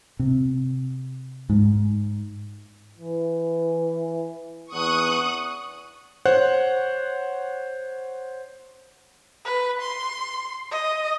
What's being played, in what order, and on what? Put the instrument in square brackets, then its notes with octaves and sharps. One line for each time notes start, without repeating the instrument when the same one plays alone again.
[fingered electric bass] C3
G#2
[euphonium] E3
[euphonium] E2 [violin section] C#6 D#6 F#6
[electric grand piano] C5 C#5 F#5 F#6
[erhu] B4
C6
D#5